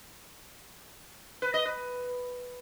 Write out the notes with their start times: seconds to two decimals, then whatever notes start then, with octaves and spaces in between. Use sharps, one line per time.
1.42 B4
1.54 D#5
1.65 B4